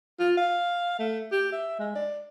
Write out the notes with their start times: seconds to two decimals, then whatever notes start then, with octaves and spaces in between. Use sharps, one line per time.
0.19 F4
0.37 F5
0.99 A3
1.32 G4
1.52 E5
1.79 G#3
1.95 D5